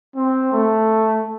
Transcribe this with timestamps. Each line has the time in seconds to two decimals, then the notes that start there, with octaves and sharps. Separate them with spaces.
0.15 C4
0.52 A3